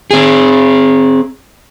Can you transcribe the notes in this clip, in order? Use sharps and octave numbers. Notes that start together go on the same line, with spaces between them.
C4 G#4